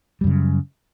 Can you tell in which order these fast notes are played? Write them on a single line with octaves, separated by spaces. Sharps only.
G3 F#2 C#3